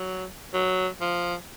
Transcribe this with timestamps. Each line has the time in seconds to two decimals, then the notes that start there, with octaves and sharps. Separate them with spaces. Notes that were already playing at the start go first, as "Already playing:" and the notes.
Already playing: F#3
0.54 F#3
1.01 F3